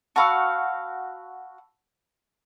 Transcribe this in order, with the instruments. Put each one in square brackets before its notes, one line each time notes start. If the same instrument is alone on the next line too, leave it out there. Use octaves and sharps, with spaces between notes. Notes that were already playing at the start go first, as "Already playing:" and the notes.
[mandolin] F#4 F5 [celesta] A5 B5 E6